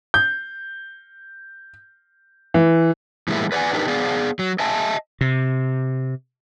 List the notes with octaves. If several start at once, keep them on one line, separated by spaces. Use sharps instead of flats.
G6
E3
A2 E3 G3 G#3 A#3 E4
B4 D5 E5 F#5 G#5
D4 D#4 G4 A#4 B4
B3 G#4 D5 F5
F#3
D#5 E5 G#5 A5
C3